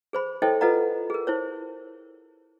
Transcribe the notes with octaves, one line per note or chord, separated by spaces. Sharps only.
G#4 C5 B5
E4 A4 C5 C#5 D#5 G5
F4 A4 B4 D#5 F#5 A#5
G#4 A#4
E4 C5 C#5